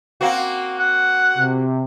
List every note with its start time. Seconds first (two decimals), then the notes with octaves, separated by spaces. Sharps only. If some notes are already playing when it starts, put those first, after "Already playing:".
0.21 A#3 C4 F#4
0.79 F#5
1.37 C3